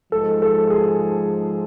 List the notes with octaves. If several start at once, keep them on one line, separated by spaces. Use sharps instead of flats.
G#2 F3 G#3 A4
A4
G#4